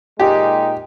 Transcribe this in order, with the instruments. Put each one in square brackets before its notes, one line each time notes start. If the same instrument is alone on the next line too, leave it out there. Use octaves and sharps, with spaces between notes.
[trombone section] A#2 G#3 D#4 [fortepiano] G4